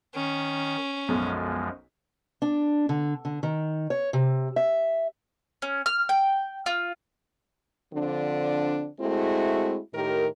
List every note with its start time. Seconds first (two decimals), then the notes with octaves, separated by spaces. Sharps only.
0.15 D#3 C#4
1.08 B1 F#2 F3 G#3
2.42 D4
2.89 D3
3.25 D3
3.43 D#3
3.90 C#5
4.13 C3
4.56 E5
5.62 C#4
5.86 F6
6.09 G5
6.66 F4
7.94 D3 F3 C4 D4
9.00 G#3 A3 C4 E4 F#4
9.94 A2 D#3 G4 A#4